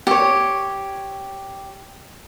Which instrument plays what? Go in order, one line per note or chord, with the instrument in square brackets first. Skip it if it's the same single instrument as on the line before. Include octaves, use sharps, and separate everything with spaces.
[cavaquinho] G4 C#5